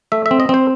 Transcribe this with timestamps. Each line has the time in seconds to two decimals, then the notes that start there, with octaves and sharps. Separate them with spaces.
0.12 A3 E5
0.26 E5
0.31 C4
0.40 D#5
0.49 C4 C5